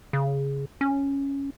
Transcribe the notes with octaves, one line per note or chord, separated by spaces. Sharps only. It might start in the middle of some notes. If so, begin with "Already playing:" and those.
C#3
C#4